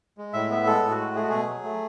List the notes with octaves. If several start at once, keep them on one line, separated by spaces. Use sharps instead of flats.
G#3
A2 E5
B3 E5
G#3 A4
A2
F#4
G#3
A3 G#4
F#4
B2 G#4
F#3
A3